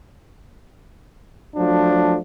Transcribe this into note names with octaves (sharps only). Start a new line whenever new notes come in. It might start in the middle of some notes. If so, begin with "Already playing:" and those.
F3 F#3 A3 D4